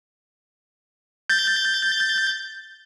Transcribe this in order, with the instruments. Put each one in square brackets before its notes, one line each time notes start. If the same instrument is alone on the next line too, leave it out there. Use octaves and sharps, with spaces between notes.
[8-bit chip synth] G6 A6